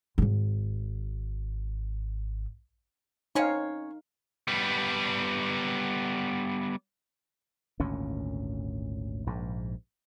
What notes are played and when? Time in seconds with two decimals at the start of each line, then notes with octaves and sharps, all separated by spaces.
0.18 D#1 G#1
3.35 C4 C#4 D#4 C#5 F5
4.48 G3 B3
7.80 G#1 D2 A#2 C#4
9.27 A#1 G#2